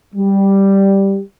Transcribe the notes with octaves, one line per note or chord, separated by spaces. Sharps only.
G3